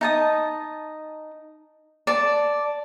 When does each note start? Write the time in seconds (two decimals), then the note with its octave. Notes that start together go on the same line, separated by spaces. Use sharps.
0.01 D#4 A5 D#6
2.07 D5 A5